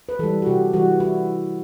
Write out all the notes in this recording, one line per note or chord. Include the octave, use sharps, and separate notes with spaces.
B4
E3 G3 A4
F#4
C3 G4
E3 G3 F#4
E4